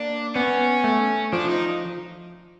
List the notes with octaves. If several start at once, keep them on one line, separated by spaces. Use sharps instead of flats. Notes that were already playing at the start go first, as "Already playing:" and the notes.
Already playing: A#3 D4
B3 C#4
A3
F3 D4
D#4